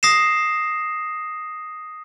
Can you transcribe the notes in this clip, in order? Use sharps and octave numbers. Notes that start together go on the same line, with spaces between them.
D#6 A#6 C7 E7